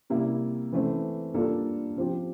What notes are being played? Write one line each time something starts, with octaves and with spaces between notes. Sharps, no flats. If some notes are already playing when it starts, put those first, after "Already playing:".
C3 G3 A#3 E4
E3 A3 C4
G3 A#3 D4 F4 A4
F3 C4 G4